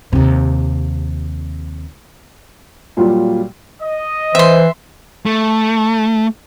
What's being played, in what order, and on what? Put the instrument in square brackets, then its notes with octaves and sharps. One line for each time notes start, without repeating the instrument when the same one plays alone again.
[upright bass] D#2 C3
[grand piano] A#2 F#3 G3 F4
[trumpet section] D#5
[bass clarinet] E3 [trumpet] C5 [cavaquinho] E5 C6
[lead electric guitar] A3